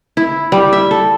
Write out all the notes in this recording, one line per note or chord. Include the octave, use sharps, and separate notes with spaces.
E4
G3
E5
A4